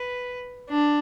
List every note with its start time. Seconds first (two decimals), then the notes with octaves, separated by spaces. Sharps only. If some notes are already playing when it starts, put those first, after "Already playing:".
Already playing: B4
0.70 D4